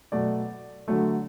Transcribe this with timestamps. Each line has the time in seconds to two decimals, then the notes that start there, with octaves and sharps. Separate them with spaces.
0.12 B2 F#3 A3 D5
0.88 D3 F#3 A3